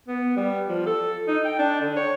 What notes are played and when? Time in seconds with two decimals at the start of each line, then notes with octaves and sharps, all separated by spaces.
0.08 B3
0.37 G3
0.69 F3
0.86 A4
1.28 D#4
1.45 G5
1.59 D4
1.81 D3
1.96 C#5